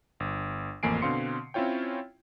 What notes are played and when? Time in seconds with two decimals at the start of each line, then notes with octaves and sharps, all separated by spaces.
0.20 G1
0.83 A1 F2 A#3 G#5 C7 D7
1.02 B2 D3 C4 F5 C6 C#7
1.54 C4 C#4 E4 F4 C#5 G5